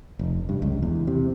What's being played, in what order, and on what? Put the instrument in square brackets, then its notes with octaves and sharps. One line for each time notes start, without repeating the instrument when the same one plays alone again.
[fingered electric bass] F1
G2
C#2
E2
C3